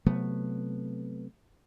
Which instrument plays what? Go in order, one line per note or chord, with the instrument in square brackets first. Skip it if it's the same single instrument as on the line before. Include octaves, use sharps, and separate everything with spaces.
[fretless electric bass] C3 F#3 A3 B3